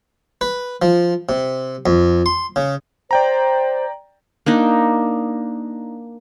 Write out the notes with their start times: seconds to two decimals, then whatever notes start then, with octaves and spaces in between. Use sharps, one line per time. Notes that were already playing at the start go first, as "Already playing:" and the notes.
0.41 B4
0.82 F3
1.29 C3
1.86 F2
2.26 C6
2.56 C#3
3.11 C5 D5 G5 A#5
4.46 A#3 D4 D#4